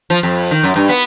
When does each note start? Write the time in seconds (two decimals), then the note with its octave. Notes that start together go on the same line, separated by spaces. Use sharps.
0.10 F3
0.23 F2
0.51 D#3
0.63 F#2
0.76 G2
0.89 B3